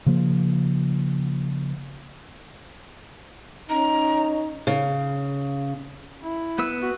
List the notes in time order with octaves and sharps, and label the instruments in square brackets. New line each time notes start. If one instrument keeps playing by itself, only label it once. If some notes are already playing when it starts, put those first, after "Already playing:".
[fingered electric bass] C#3 F3 A#3
[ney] C#4 [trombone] D#4 [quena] A#5
[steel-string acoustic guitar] C#3
[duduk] E4
[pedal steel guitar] B3 B4 E6
[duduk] F#4